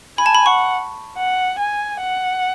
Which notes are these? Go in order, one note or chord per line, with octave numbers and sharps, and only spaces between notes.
G#5 B5
A5
B5
F#5 C#6
F#5
G#5
F#5